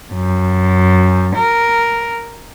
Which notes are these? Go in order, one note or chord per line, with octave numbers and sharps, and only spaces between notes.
F#2
A#4